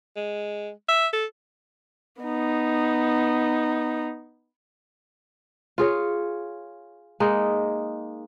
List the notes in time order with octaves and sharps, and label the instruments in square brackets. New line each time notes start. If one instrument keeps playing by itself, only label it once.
[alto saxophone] G#3
E5
A4
[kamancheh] B3 D#4
[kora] F4 G#4 C#5
G#3 A#3 D#4